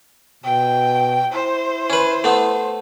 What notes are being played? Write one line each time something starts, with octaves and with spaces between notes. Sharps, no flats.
B2 G5
E4 C5
C#4 B4
A3 B3